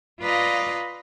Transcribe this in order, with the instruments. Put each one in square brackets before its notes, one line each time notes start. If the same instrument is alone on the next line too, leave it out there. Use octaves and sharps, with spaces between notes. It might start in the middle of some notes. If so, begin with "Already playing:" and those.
[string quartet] F4 B4 D5 D#5 F5 A#5